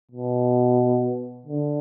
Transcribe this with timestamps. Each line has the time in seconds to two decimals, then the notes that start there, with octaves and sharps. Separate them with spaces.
0.11 B2
1.46 D3